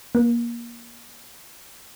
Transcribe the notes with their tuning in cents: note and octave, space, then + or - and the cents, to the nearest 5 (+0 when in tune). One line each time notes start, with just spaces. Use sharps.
A#3 +20